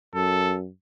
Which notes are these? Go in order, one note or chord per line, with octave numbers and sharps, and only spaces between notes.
F#2 A4